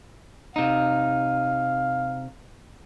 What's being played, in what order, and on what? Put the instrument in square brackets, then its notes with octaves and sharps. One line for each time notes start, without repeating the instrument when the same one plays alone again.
[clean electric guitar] C3 D#4 [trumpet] F5